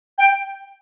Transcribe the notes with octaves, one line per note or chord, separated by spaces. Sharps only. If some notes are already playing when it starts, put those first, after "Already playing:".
G5